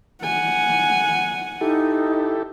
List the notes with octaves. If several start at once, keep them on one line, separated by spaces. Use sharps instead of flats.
F#5 G#5
D#4 E4 G4 A4